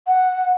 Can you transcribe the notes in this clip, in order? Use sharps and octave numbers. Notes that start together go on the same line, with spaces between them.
F#5